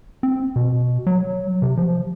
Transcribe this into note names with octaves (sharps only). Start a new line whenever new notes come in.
C4
B2
F#3
C3
F3